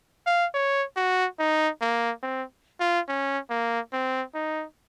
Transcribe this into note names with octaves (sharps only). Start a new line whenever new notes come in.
F5
C#5
F#4
D#4
A#3
C4
F4
C#4
A#3
C4
D#4